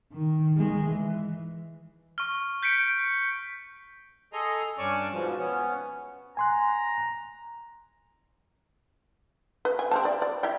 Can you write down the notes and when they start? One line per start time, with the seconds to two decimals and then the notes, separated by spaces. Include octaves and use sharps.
0.12 D#3
0.57 D#3 G#3
0.88 E3
2.18 C#6 F6
2.63 G6 B6 C#7 D7
4.33 G#4 A4 D#5 A#5 C6
4.78 G2 C#4 D5 G#5 A5 C#6
5.12 G#2 B2 F3
5.37 B3 C#4
6.37 G#5 A#5 C6 F#6
9.65 B4
9.79 G#5
9.91 C4 G4 A5
10.05 D5
10.22 D5
10.43 E4 E5 G5